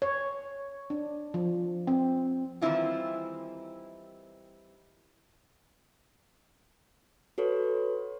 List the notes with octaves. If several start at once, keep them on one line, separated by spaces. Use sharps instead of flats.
C#5
D4
F3
C4
D#3 E3 G3 C4 E4 F4
F#4 A4 B4 C#5